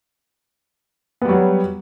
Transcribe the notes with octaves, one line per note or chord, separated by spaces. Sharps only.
F#3 G3 B3